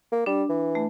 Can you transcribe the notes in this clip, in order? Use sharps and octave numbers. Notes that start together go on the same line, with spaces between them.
A#3
G3 D4
E3
A3